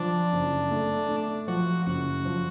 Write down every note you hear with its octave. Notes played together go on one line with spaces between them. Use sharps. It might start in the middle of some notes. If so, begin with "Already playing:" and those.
Already playing: F3 D4
F#1
A3
A3
F3 F#4
F#1 F#4
F3